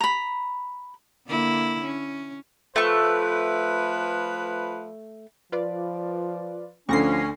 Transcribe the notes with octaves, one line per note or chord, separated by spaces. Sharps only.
A#5 B5
D3 A#3 E4
C#4
F3 A3 B4 C#6
F3 F4 B4 D5
D2 D3 F3 C#4 C#6 A#6 C7